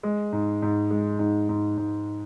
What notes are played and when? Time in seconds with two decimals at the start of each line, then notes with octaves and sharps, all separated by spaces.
0.03 G#3
0.33 G#2
0.62 G#2
0.90 G#3
1.19 G#2
1.49 G#2
1.77 G#2